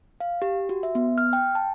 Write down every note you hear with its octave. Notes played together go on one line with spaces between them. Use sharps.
F5
G4
F#4
E5
B3
F6
G5
A5